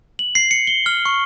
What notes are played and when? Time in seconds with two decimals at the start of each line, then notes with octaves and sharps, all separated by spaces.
0.19 F#7
0.35 C7
0.51 C#7
0.67 G7
0.86 F6
1.06 C#6